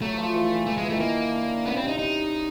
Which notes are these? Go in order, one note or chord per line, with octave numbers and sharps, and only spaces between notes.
F#3 A3
F3
E3
E3
E3 A3
F3 G#3
E3
D#3 A3
A#3
D3
C#3 B3
C4
C3
D#4
D#4